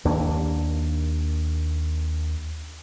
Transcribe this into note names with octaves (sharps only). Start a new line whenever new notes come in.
D#2 A#3 D4